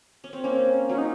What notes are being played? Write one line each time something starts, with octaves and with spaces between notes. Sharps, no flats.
C#4
C4
A#3 C#4
F#3 C#4
D#4